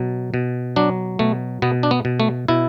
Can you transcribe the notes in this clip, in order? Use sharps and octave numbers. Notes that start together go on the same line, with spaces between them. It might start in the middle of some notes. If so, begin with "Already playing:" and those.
Already playing: B2 F#3
B2
F#3 D4
B2 A3
B2 B3
D4
B3
B2
A3
B2 E4